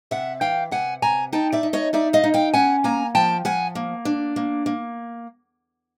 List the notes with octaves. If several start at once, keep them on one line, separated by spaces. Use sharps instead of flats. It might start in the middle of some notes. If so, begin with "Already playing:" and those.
C3 E5 F#5
E3 F5 G5
C3 F#5 G#5
C3 G#5 A#5
D#4 G5 A5
D5 E5
D#4
C#5 D#5
D#4 D5 E5
D#5 F5
D#4
F5 G5
C#4 F#5 G#5
A#3 G#5 A#5
F3 G5 A5
F3 F#5 G#5
A#3
D4
A#3
A#3